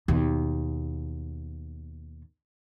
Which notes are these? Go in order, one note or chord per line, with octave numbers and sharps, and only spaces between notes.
D#2 B2